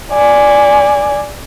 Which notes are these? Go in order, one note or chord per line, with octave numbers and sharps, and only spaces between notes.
D5 G#5